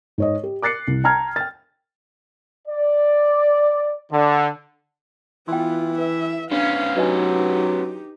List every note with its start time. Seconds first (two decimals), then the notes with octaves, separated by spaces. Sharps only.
0.18 G#2 C#5 D#5
0.43 G4
0.62 D6 F#6 A6 C7 C#7
0.87 C2
1.04 G5 A5 A#5 F6 G#6
1.36 G5 A6
2.67 D5
4.11 D3
5.48 E3 B3 F4 G5 C6
5.98 B4 E5
6.51 B3 C#4 D4 F5
6.96 F#3 D#4 G4 B4 D#5 G#5